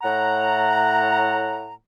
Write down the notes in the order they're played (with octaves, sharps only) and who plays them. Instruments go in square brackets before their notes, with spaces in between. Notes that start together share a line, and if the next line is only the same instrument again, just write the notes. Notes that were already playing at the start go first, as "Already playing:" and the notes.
[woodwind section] A2 F#5 A#5